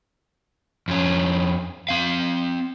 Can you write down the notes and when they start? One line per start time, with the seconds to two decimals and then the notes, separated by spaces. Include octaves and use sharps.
0.88 F2 C#4
1.89 C4 F5